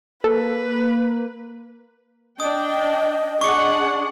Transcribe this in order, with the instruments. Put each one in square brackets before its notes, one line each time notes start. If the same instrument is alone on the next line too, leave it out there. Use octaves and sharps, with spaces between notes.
[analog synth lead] A#3 [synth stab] A4 [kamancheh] B4
[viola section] D4 G5 [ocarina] D#5 [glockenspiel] D#6
[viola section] D4 G#4 F#5 [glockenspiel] C#6 D6 C#7